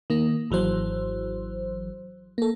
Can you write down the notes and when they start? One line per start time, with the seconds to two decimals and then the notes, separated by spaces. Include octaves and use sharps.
0.10 D#3 A#3
0.51 G#1 E3 F#3 C5
2.38 A#3 A4